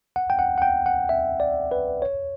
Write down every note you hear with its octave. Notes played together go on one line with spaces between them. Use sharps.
F#5
G5
F#5
F#5
G5
F#5
E5
D5
B4
C#5